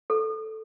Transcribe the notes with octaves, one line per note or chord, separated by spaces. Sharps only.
A4